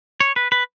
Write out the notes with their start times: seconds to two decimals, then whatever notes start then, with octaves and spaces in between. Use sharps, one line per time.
0.20 C#5
0.36 B4
0.52 B4